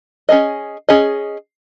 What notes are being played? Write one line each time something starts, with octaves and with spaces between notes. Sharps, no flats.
C#4 G#4 D#5
C#4 G#4 D#5